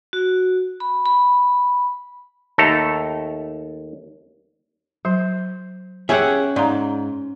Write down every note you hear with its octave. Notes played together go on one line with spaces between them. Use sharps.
F#4
B5
B5
D#2 A3 A4 A#5
F#3 C5
C#4 G4 G#4 E5 F#5
G#2 D5 F5 A#5